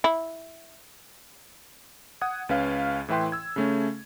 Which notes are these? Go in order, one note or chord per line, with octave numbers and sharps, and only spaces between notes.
E4
F#5 D#6 G#6
C#2 C#4 B4 F5 F6
A2 E3 E4 B4 G5 C6
E6 G#6
C#3 A3 C#4